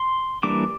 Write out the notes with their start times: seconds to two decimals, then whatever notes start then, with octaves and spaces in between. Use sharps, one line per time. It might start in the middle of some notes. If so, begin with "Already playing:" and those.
Already playing: C6
0.43 E3 G3 A#3 D4 D6